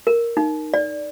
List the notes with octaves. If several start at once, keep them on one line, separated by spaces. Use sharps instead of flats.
A#4
D#4
D5